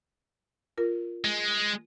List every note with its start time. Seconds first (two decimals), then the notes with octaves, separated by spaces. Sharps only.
0.77 F4 A#4
1.25 G#3